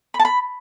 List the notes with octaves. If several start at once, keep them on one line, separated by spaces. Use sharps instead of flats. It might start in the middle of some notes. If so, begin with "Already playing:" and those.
B5
A5
B5